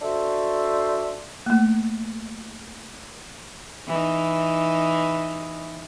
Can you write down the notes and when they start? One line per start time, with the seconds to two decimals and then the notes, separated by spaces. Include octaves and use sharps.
0.02 D4 F#4 A4 C5 E5
1.46 A3 A#3
3.87 E3 D#4